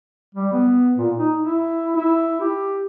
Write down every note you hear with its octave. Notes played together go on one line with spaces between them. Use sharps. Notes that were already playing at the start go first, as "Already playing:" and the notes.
G3
B3
A#2
D#4
E4
E4
G4